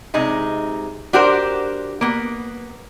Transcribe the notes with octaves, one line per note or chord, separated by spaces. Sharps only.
C3 G#3 D#4
D4 F#4 G4 A#4 C5
A#3 B3